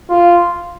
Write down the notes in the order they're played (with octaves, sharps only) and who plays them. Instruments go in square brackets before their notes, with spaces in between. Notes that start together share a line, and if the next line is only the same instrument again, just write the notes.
[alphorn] F4